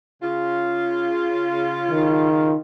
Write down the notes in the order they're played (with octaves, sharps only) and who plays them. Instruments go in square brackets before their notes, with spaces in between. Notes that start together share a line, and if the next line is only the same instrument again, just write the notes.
[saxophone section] C#3 F4
[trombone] D#3